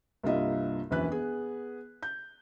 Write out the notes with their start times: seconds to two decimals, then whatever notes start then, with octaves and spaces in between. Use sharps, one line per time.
0.24 C2 G2 A#3 F4 D#5 E5
0.91 E1 A#1 F#2 E3 B4 F#6
1.08 B3 G#4
2.03 G6